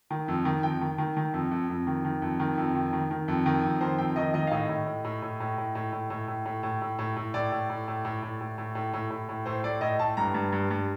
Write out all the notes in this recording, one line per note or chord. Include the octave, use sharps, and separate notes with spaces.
D#3
F2
D#3
F2 G5
D#3
D#3
D#3
F2
F2
F2
D#3
D#3
F2
D#3
F2
D#3
D#3
D#3
F2
D#3
F2
D#3 C5
F2 G5
D#3 D#5
D#3 D#5
F5
A2 D#5
A2
A2
A2
A2
A2
A2
A2
A2
A2
A2
A2
A2
A2
A2
A2
A2 D5
A2
A2
A2
A2
A2
A2
A2
A2
A2
A2
A2
A2 C5
A2 D5
A2 D#5
A2 A5
G2 A#5
G2
G2
G2